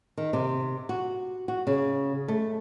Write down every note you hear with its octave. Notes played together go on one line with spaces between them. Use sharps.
D#3
C3
F#4
F#4
C#3
A3